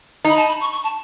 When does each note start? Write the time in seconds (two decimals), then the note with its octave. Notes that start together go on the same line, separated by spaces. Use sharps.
0.25 D#4 B5
0.37 A5
0.49 B5
0.61 C#6
0.72 C#6
0.84 A5